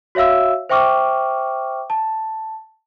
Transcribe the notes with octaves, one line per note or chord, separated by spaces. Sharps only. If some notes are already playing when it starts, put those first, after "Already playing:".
F#4 C#5 E5 F5 E6
C5 E5 G5 C#6 D6 F6
A5